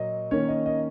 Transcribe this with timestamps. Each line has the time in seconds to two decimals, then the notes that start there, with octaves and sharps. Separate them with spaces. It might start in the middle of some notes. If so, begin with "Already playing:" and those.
Already playing: A#2 F#3 A#3 D#5
0.31 D#3 A#3 C#4 C#5
0.49 D#5
0.66 D#5